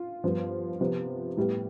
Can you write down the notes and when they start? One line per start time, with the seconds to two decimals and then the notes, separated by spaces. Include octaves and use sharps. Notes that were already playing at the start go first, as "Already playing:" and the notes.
Already playing: F4
0.23 G2 F3 B3
0.80 C3 F3 B3
1.37 A2 G3 B3